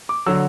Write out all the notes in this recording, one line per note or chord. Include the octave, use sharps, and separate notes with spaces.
D6
D3 F#3 E6